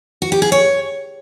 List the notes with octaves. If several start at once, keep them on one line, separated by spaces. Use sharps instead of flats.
F#4
G4
G#4
C#5